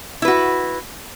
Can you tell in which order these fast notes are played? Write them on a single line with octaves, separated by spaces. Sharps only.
E4 B4 F#4